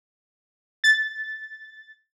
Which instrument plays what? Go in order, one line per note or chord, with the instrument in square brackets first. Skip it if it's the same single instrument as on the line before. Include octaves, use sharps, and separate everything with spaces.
[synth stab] A6